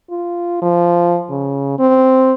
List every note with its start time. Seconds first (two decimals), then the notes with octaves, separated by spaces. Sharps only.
0.10 F4
0.62 F3
1.30 C#3
1.79 C4